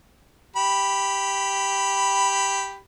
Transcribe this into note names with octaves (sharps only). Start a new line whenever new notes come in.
G4 B5